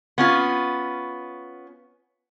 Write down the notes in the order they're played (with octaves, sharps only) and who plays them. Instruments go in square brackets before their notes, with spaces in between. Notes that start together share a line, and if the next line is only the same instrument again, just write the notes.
[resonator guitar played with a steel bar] B3 C#4 F4